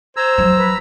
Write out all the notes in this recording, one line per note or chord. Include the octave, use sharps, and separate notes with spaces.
C5 A#5 E6 G#6
F3 F#3
B4